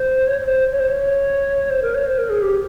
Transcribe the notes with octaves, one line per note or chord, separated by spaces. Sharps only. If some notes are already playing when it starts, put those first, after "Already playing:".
Already playing: C5
C#5
C#5
C5
C#5
C5
C#5
C5
A#4
C#5
C5
A#4
G#4
G4